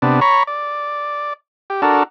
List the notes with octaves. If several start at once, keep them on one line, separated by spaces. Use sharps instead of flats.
C3 B3 D4
C#5 A#5 B5 C#6
D5
G4
D4 F#4 A4 A#4